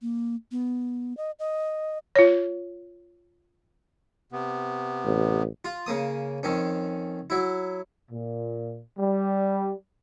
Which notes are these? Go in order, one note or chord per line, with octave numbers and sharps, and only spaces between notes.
A#3
B3
D#5
D#5
F4 C#5
C3 B3
A1
F4
C#3 A#3 D#6
F2 D#3 C#4
F#3 E4
A#2
G3